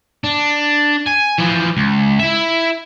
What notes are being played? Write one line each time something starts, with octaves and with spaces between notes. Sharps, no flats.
D4
G#5
E3 F3
C#2
E4 E5